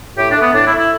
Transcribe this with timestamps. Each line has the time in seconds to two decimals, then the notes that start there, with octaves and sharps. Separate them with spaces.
0.17 A2 G4
0.30 D4
0.36 A3 B3
0.54 A2 D4
0.66 E4
0.72 A3
0.78 E4